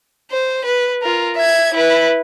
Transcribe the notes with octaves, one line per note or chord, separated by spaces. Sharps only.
C5
B4
F4 A#4
E5 G#6
E4 B4